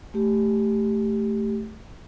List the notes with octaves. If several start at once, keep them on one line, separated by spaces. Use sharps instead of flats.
A3 G4